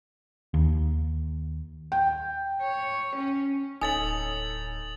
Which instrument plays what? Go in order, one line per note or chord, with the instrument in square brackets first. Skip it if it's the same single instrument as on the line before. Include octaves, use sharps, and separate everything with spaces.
[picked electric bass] D#2
[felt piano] G5
[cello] C#5
C#4
[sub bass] D1 [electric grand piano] D#4 A4 C#5 [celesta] G#5 [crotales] D#6 A6 F#7